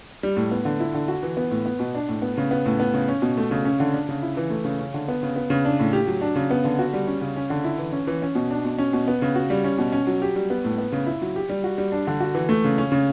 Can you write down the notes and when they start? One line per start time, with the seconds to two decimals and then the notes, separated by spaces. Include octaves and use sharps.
0.23 G3
0.37 A2
0.51 B3
0.65 D3
0.80 E4
0.94 D3
1.08 F#4
1.23 E3
1.37 B3
1.51 A2
1.66 B3
1.80 B2
1.95 D4
2.09 A2
2.22 B3
2.37 C#3
2.51 B3
2.66 A2
2.80 B3
2.94 C#3
3.08 C#4
3.22 B2
3.37 A3
3.51 C#3
3.65 C#4
3.80 D3
3.94 D4
4.09 C#3
4.22 E4
4.37 E3
4.50 A3
4.65 C#3
4.79 C#4
4.94 D3
5.08 B3
5.23 C#3
5.36 B3
5.50 C#3
5.65 D4
5.80 A2
5.93 G4
6.07 F#3
6.21 D4
6.36 C#3
6.51 B3
6.65 D3
6.79 F#4
6.93 G3
7.07 C#4
7.21 C#3
7.36 C#4
7.50 D3
7.64 E4
7.79 E3
7.92 C#4
8.07 E3
8.22 C#4
8.35 B2
8.51 D4
8.65 B2
8.78 C#4
8.93 B2
9.08 B3
9.22 C#3
9.35 F#4
9.50 G3
9.64 C#4
9.79 B2
9.92 C#4
10.07 F#3
10.22 G4
10.36 G3
10.50 B3
10.65 A2
10.78 B3
10.92 C#3
11.06 E4
11.22 F#3
11.36 G4
11.49 G3
11.64 F#4
11.78 G3
11.92 D4
12.07 D3
12.20 F#4
12.35 E3
12.49 A3
12.64 C#3
12.78 C#4
12.92 C#3